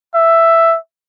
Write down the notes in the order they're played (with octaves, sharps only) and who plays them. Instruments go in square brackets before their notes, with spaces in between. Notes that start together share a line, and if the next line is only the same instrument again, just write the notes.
[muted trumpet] E5